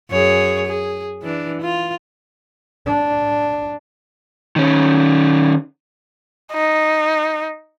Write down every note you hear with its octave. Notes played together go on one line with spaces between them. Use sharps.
F#2 G#4 C#5
G#4
E3 D4
F4
D4
D#3 C#4
D#4